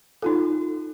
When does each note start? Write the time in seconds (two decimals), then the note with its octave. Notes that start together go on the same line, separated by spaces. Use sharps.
0.22 D#4 F4 A4